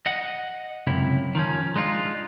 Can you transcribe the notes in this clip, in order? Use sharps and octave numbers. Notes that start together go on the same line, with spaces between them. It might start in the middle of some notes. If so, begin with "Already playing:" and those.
D#5 F#5
C#2 F#2 C3 E4
D#3 F3 C#4
G#3 D4 D#4 F4